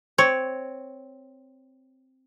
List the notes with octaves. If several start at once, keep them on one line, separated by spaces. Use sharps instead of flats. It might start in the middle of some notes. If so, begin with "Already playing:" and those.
C4 C#5